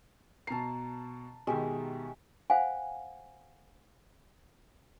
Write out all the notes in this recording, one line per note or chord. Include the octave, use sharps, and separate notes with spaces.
B2 A5 A#5 C7
B2 D#3 G#3 G4 E5
C5 F5 F#5 G#5